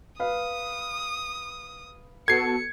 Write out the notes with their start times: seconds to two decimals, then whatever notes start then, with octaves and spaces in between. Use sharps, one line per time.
0.20 B4 F5 D#6
2.28 B3 F#4 A4 G#6 C7 C#7